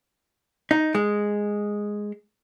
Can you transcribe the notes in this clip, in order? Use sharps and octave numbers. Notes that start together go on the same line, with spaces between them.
D#4
G#3